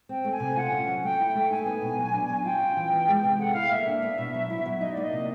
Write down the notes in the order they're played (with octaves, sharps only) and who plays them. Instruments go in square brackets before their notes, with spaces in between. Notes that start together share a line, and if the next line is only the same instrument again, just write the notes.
[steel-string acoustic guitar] C4 [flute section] G5
[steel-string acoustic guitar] A3
[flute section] G#5
[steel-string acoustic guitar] C3
[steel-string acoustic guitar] F4 [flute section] F#5
[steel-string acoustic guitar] C#4
F#3
[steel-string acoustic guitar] A3 [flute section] G5
[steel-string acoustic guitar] E4
[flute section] G5
[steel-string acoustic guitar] A3
[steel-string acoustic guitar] D#4 [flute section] G#5
[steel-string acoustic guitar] B3
B2
F#3
D4
F#3
[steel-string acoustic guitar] F4 [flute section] G5
[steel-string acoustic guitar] C#4
E3
B3
G#3
C3
[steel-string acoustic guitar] A4 [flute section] F#5
[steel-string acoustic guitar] E4 [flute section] F5
[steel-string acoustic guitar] A#3 [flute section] E5
[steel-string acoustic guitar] D4
B3
B2
F#3
E4
F#3
[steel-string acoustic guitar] D#4 [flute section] D#5
[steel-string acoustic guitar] A#3 [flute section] D5
[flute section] D#5
[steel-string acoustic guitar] C3